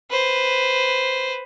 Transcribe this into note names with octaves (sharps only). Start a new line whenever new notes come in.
B4 C5